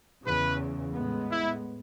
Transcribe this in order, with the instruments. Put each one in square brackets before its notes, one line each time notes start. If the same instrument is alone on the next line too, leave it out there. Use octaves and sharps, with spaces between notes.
[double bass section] E2 C#3 E3 [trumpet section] B4
[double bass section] A2 G#3 B3
[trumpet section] E4